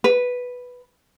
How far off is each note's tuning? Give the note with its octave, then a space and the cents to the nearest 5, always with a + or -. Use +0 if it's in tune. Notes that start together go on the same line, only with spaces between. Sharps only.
B4 +0